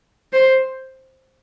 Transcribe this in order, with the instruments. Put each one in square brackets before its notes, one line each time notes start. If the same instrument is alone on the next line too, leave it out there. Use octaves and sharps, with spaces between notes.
[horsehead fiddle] C5